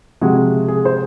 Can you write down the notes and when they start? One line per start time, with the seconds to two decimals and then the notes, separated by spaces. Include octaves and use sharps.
0.21 C3 F3 G#3 F#4
0.68 G#4
0.85 C5